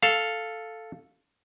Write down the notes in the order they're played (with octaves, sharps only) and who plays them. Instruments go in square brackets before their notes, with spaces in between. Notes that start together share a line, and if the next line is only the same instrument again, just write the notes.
[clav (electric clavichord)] A4 F5